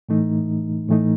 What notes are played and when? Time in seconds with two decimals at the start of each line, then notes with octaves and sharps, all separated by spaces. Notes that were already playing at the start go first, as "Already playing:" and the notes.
0.09 A2 E3 A3 D#4
0.89 A2 E3 A3 D#4